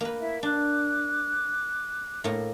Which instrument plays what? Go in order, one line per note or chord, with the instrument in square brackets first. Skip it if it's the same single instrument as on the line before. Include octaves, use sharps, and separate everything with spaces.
[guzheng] A#3 B4
[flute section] E4 E5
[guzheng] D4 [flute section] D6 F#6
[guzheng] A2 A#3